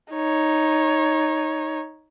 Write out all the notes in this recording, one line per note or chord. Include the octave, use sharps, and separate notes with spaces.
D#4 C#5